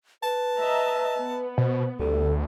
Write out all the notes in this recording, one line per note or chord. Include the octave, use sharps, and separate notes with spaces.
B4 A5
D#5 E5 A#5
B3
B2 C5
D2 G3 A4